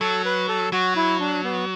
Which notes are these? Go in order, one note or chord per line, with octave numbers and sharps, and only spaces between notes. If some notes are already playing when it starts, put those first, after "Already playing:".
F#3 A4
B4
A4
F#3 F#4
E4
D4
B3